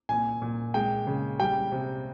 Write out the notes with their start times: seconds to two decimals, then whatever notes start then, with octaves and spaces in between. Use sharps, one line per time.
0.09 A#2 G#5
0.42 A#2
0.74 G#3 G5
1.07 C#3
1.39 G3 G5
1.72 C3